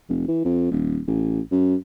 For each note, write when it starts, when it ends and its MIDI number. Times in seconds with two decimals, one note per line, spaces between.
0.09 0.25 29
0.28 0.42 52
0.45 0.70 41
0.71 1.00 27
1.07 1.41 33
1.52 1.76 42